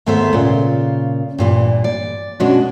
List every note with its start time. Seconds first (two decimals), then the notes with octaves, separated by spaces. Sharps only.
0.06 D#2 G#2 A3 B3 C5 E5
0.33 A#2 C#3 F4
1.38 G2 A#2 E3
1.84 D5
2.40 B2 G#3 C#4 D4 F#4